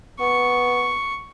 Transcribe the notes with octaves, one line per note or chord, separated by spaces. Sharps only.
B3 C#6